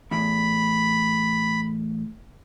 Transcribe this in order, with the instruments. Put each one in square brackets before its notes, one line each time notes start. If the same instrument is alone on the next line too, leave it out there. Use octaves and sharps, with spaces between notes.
[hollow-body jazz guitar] E2 A2 [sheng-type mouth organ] B5